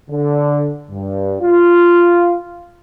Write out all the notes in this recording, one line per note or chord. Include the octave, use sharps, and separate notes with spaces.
D3
G2
F4